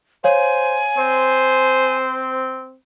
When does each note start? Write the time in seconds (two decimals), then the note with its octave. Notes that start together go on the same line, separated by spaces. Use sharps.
0.24 C5 C#5 F5 G#5
0.98 C4 C5